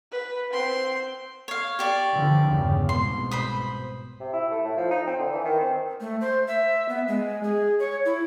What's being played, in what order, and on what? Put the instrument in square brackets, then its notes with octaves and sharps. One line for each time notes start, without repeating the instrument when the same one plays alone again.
[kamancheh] B4
C4 C6
[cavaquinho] C#5 F5
G4 D5 C#6
[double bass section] D3 E3 F3
E2 G2 C#3
[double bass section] C2 G#2 B2 [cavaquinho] C6
[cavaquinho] C5 B5 D#6
[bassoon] C3
E4
A3
A2
F3
D#4
C4
D3
E3
D#3
C4
[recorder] A3
C5
E5
B3
G#3
G#4
C#5
E4